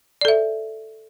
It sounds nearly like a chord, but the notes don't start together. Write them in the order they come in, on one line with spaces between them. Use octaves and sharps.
D5 A4 E5